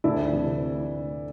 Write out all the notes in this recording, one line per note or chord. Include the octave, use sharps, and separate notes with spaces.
D2 D4 E4
C3 E3